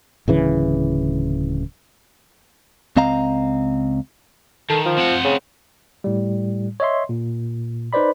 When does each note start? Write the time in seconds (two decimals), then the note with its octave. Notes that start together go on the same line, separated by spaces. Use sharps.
0.28 D1 C#3 E3
2.97 C#2 C4 D#5 F5 A#5
4.70 D#3 A4
4.85 F3
4.98 C4 F#5
5.24 C#3
6.04 A2 G3
6.80 C#5 D#5 E5 C6
7.09 A#2
7.93 D#4 B4 C5 D5 B5